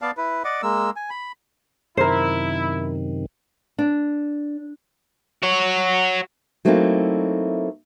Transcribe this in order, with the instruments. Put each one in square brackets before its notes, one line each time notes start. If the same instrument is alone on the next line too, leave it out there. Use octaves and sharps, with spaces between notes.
[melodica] B3 D5 F5 A5
E4 B4
D5 D#5 F#5 D6
G#3 A#3 E6
G#5
B5
[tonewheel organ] F#2 C3 D#3 [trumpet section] E4 [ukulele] A#4 C5
[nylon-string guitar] D4
[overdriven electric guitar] F#4 C#5
[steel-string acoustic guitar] F#3 A3 A#3 C4 D#4 E4